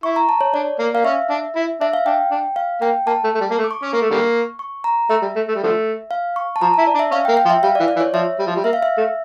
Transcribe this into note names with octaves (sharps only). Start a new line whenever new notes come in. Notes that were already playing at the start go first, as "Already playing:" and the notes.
E4 C#6
A#5
A5
C#5
D4 D5
A#3
A#3 F5
C#4 E5
D4
E4
D4 E5
F5
D4 G5
D4
F5
A#3 G5
A#3 A5
A3
A3
G3
A#3
A3
D6
C#6
C#4 D6
A#3 C#6
A3
D3 G3 A#3
C#6
A#5
A3 E5
G3
A3
A3
G3
D3 F3 A3
F5
C#6
A5
F3 A#5
E4 A5
D5
D4
E5
C#4 F5
G5
A#3
G5
F3
E5
G3 F5
D5
E3
D5
E3
C#5
F3 E5
G3
F3
G3
A#3 E5
F5
E5
A3